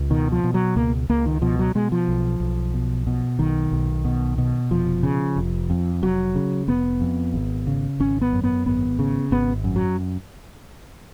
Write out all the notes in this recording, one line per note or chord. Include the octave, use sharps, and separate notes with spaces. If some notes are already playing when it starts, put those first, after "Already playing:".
Already playing: C#2
B2 D#3
F3
B2
F#3
C#2 A#3
C#2 A#3
D#3
B2 F3
F#3
B2 G#3
F3
B1
B1
B2
B2
B1 D#3
B1
B2
B2
F1 F3
C#3
F1
F2
F1 F#3
C#3
F1 B3
F2
G#1
C#3
G#1 C#4
B3
F#2
B3
G#1 B3
C#3
G#1 B3
F#2
F#3